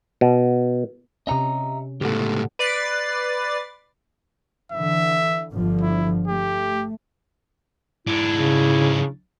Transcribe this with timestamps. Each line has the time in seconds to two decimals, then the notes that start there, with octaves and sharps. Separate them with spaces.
0.21 B2
1.27 C3 C#4 D#5 E5 A#5
2.01 C#2 A2 G4 A4 F#5
2.59 B4 D5 A6 C7
4.72 D3 E3 E5
5.52 G1 D3 F3
5.81 E4
6.28 A3 G4
8.07 G#2 D4 E4
8.35 C#3